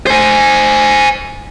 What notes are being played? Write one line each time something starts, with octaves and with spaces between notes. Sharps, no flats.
C5 G#5